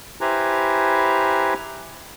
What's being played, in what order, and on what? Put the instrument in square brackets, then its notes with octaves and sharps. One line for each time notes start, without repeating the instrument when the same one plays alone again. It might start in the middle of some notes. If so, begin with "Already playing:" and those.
[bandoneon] E4 G4 B4 C5 G#5 A#5